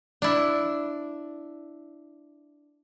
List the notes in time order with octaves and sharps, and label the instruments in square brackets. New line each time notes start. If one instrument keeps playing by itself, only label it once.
[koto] D4 E4